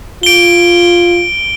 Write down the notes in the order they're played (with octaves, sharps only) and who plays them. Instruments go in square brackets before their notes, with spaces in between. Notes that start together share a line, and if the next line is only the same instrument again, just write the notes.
[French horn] F4 [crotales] D7 G7